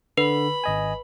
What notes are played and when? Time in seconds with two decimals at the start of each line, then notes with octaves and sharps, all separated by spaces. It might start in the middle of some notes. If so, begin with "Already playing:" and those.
0.18 D3 B4 B5
0.64 G#1 D#5 G#5